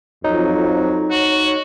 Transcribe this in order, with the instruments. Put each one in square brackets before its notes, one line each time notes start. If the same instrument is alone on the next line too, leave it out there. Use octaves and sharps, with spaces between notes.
[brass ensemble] F2 [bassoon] F#3 [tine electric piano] D#4
[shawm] F#4 [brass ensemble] C#5